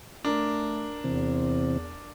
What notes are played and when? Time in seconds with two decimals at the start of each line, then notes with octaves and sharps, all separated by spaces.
0.25 A3 D4 A#4
1.04 E2 C3 E3 C4